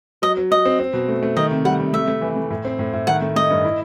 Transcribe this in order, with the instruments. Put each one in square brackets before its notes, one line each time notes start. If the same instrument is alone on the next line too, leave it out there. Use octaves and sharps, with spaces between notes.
[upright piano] F#3 [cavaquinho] D#5
[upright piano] F#3
[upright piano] F#3 [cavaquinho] D#5
[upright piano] C4
C4
B2
A3
A3
[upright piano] D#3 [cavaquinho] D#5
[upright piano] C3
[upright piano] G3 [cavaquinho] F#5
[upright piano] C3
[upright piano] A3 [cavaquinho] E5
[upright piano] A3
E3
A3
A2
C4
A2
A2
[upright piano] D#3 [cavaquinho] F#5
[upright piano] A3
[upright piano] A3 [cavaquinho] D#5
[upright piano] G2
E4